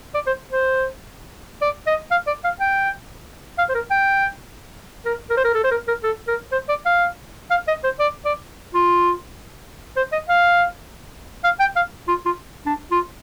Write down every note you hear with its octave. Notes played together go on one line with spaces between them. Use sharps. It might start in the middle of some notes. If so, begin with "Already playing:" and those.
D5
C5
C5
D5
D#5
F5
D5
F5
G5
F5
C5
A#4
G5
A#4
A#4
C5
A#4
A4
C5
A#4
A#4
A4
A#4
C5
D5
F5
F5
D#5
C5
D5
D5
F4
C5
D#5
F5
F5
G5
F5
F4
F4
D4
F4